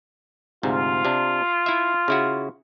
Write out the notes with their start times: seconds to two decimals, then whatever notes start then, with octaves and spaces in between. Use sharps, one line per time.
0.63 D2 G#2 C3 F4
1.05 C3 D4
1.66 E4 E5
2.08 C#3 E4 F#4